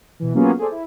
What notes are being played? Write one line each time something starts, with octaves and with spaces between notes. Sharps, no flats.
B2 E3
F#3 A#3 B3 C#4 F4 G#4
G#4 A4 C5 D5
E4